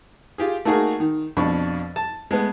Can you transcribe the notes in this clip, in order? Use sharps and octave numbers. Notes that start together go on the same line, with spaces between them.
F4 G4 G#4
A3 A#3 D#4 F#4 G#4 A#4
D#3
F2 B2 D4 B5 C#6
A5
G#3 A3 B3